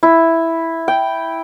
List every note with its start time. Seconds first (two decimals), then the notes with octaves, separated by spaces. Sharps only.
0.03 E4
0.88 G5